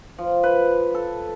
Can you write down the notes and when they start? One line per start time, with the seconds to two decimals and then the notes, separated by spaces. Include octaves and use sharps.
0.18 F3
0.43 B4
0.94 A4